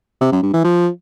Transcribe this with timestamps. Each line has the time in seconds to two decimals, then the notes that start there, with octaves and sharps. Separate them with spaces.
0.21 C3
0.32 F#2
0.42 G2
0.53 E3
0.64 F3